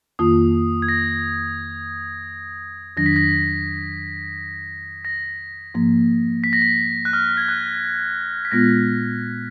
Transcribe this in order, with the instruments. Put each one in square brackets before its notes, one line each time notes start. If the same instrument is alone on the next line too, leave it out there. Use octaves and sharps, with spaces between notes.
[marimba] F2 D#3 A#3 F4 [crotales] D#6
[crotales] G#6
A#6
[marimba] F2 D#3 F#3 D4 [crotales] A#6
[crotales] B6
A#6
A#6
[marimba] G#2 F3 A#3
[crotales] B6
A#6
B6
F#6
F6
G#6
F#6
B6
[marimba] A#2 G#3 B3 F4 [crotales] A#6